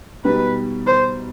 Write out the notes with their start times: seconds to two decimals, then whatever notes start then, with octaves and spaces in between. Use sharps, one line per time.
0.24 B2 G3 B3 D#4 B4
0.87 C5